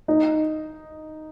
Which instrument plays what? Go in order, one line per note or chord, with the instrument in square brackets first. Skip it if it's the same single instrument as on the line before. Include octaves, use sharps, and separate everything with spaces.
[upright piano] D#4